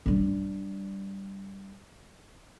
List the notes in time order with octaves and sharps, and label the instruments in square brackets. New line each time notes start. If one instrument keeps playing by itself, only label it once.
[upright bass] G3 D4